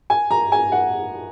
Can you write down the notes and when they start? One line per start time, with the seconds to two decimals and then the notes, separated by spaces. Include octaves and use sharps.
0.10 G#5
0.31 A#5
0.52 G#5
0.72 F#5